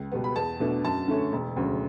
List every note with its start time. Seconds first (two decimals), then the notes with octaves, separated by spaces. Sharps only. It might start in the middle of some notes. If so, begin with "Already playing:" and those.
Already playing: C#2
0.12 B2 G3 B3
0.24 B5
0.36 E2 A5
0.60 B2 A3 D4
0.84 F#2 A5
1.08 D3 A3 C#4
1.33 E1
1.56 D2 C#3 F#3